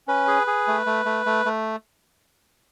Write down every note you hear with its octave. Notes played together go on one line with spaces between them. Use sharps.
C#4 B4
G#4
G#4
A3
A3
A3
A3
A3